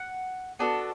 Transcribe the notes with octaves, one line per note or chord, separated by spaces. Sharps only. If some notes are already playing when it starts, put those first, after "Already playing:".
Already playing: F#5
B3 D4 F#4 A4